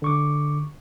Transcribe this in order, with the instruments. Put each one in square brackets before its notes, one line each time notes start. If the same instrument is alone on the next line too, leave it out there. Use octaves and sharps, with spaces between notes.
[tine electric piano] D3 C#6 D6